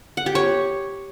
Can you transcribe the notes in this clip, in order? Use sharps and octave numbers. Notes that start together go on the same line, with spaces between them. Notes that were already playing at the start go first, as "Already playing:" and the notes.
F#5
G4
C#5